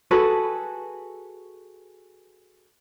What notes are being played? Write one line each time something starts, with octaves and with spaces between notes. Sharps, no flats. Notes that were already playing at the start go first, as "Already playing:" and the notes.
F#4 G#4 A4 B4